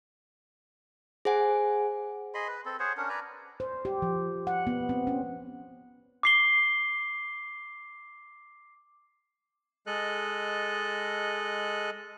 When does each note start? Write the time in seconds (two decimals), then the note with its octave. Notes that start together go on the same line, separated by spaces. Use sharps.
1.25 G#4 C5 F#5 G#5
2.34 G#4 D#5 B5 C6
2.48 B4
2.65 C4 A4
2.80 G#4 C5 C#5 F#5
2.97 C#4 D4 A#4 F#5
3.09 B4 D5 G#5 A#5
3.60 C5
3.85 G4
4.02 F3
4.47 F#5
4.67 B3
4.89 C4
5.07 C#4
6.23 D6 C7 G7
9.87 G#3 A4 D#5 F#6